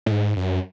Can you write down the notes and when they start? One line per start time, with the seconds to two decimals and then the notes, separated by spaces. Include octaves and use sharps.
0.06 A2
0.11 G#2
0.37 F#2